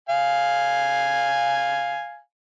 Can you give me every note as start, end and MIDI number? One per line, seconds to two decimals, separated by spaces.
0.09 2.19 77
0.09 2.19 80